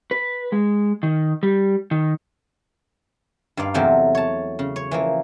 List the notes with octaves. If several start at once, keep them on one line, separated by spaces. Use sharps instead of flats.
B4
G#3
D#3
G3
D#3
G2 D#4 D5 F5
E2 C3 F#3 A3 G5
C#5 A5
C#3
C#5
E3 F3 A#3